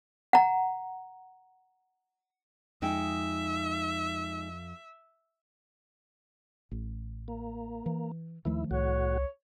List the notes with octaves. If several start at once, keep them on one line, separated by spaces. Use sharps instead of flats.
F#5 A#5
F2 G#3 D#4 E5 G5
A1
A#3
E3
D#2 D#3 F3 A3 E4
C2 A2 F#4 C#5